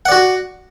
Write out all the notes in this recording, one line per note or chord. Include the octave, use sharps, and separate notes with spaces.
F#4 D5 F#5